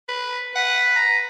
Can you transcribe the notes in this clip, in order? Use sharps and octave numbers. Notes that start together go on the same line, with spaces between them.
B4
B4 F#5
A#5